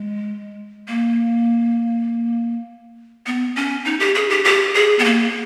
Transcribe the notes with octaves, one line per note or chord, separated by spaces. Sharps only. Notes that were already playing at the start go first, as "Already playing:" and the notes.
Already playing: G#3
A#3
B3
C#4
D#4
G4
G#4
G4
G4
G#4
B3
A#3